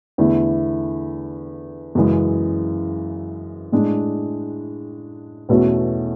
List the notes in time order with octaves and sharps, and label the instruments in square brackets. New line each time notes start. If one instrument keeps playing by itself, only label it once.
[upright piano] E2 D3 A3 E4
F#2 C#3 E3 G#3
A2 G#3 D4
E2 B2 A3 C#4 F#4